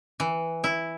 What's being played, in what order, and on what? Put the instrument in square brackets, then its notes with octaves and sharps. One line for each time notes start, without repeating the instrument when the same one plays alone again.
[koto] E3
E4